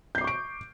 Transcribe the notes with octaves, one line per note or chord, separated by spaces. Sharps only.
C#6 D6 G6 C7 D7